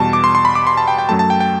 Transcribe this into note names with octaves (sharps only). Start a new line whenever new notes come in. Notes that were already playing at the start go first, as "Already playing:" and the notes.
Already playing: E2 B2 G3 A5
D6
C6
C6
B5
D6
C6
A5
G5
G5
F#2 F#3 A3 A5
A5
G5
G5